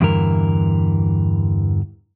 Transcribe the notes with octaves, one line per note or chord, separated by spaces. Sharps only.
E2 G2 D3 E3 A#4